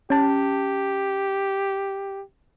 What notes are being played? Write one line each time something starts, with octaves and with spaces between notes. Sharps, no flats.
C#4 G4 A5